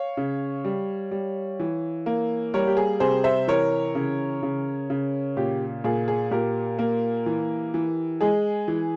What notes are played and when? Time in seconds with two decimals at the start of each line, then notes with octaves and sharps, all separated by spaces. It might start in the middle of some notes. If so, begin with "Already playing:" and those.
Already playing: C#5 F5
0.17 C#3
0.65 G3
1.11 G3
1.60 E3
2.06 A#3
2.54 G3 A#4 C#5
2.67 G4
2.77 G#4
3.00 C3 G#4 C5
3.24 C5 E5
3.48 E3 A#4 C#5
3.95 C#3
4.43 C#3
4.90 C#3
5.37 A#2 G4
5.84 A#2 G#4
6.08 G#4
6.31 A#2 G4 A#4
6.79 A#3
7.26 E3
7.74 E3
8.21 G#3 G#4
8.68 E3